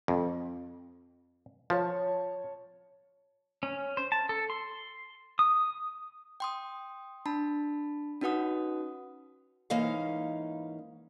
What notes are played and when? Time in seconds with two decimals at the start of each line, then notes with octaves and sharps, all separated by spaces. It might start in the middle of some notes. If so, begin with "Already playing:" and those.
0.08 F2
1.70 F3 C#5 A5
3.63 C#4
3.97 C5
4.12 A5
4.29 A4
4.50 C6
5.39 D#6
6.40 G5 C6 D#6
7.26 D4 A5 B5
8.21 C#4 D#4 F#4 B4 F#5 D#6
9.70 G#2 E3 A#3 C#4 D#4 F5